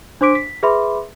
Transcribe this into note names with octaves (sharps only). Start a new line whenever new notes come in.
D4 C5 C6 D6 B6 D7
B6
G#4 B4 E5 B5 C6 D6